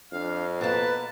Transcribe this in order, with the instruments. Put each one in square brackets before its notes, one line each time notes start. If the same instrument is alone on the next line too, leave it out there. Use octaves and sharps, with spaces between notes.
[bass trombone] F2 [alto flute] D4 [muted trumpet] F5
[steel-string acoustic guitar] B2 A#3 [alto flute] B4 [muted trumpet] A5